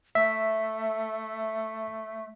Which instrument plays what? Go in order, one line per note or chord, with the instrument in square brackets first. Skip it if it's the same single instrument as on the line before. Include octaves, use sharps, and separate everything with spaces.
[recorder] A3 [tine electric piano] E5